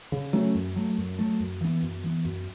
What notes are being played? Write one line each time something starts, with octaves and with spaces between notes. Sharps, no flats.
C#3
F#3 A3 C#4
F#2
F#3 A3
F#2
F#3 A3
F#2
E3 B3
F#2
E3 B3
F#2